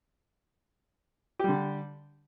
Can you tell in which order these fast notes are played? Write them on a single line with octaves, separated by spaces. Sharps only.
G4 G3 D3